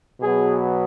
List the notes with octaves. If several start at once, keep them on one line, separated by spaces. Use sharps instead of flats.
B2 F#3 B3 G#4